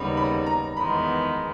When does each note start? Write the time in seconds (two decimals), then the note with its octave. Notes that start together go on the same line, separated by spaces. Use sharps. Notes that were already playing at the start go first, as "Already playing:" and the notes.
Already playing: D#2 C#3 G3 B3 D#4 B5
0.17 B5
0.46 A#5
0.76 E2 D#3 G#3 B3 B5